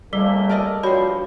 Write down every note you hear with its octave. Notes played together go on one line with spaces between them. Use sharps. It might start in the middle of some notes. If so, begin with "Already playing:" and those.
C#2 G3 A3 A#3 E6 B6 G7
A#4 D5 D#5 A5 E6
G2 F3 G3 F#4 C5 C#5 B5